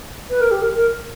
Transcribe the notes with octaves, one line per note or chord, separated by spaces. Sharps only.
B4
A#4
G4
A#4
A#4